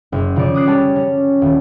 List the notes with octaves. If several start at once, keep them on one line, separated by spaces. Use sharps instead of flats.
F#1
C#3 F3 C#4 D5 C#6
D6 D#6 F#6 C7
G3 C#5 A5
C#4
D#1